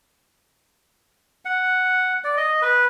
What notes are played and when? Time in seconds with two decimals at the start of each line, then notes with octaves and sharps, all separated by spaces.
1.45 F#5
2.24 D5
2.37 D#5
2.62 B4